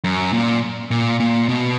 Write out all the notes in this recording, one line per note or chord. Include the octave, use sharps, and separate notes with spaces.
F#2
A#2
A#2
A#2
B2